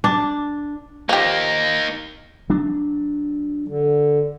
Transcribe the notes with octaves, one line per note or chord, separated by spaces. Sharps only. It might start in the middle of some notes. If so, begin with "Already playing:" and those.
D4
F3 A#3 D#4 G4
F#3 D4
D3